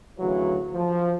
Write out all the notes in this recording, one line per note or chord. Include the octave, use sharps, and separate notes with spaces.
D2 C#3 E3 F#3
F3